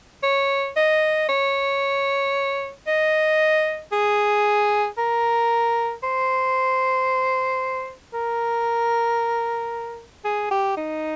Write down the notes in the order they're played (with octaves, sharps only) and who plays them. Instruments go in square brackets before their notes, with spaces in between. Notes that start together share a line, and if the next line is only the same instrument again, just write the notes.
[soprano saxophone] C#5
D#5
C#5
D#5
G#4
A#4
C5
A#4
G#4
G4
D#4